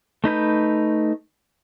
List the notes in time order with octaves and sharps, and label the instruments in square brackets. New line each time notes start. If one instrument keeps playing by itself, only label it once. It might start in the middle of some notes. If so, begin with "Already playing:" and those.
[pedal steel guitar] A3 D#4 B4 G6